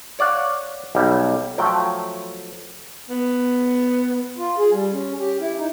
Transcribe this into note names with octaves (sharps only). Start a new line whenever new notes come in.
C#5 D5 F5 F#5
B1 G3
F3 F#3 A3 G5
B3
F4
G#4
G3
C#4
G4
E4
D#4